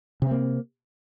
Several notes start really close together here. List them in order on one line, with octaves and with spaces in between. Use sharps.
C3 C4 A#3